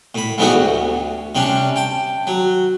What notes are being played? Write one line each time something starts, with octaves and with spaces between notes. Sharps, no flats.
A2 B5
G#2 E3 G3 A3 B3 F#4
D2
C3 G3 C#4 D4
G5 A5
F#3